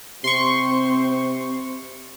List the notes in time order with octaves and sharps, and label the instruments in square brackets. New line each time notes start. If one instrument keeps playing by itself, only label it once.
[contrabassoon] C3 [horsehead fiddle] C4 [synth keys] C6 C#6